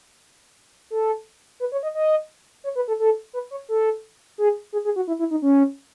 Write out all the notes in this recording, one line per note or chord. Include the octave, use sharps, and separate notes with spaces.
A4
B4
C#5
D#5
D#5
C#5
B4
A4
A4
B4
C#5
A4
G#4
G#4
G#4
F#4
E4
E4
D#4
C#4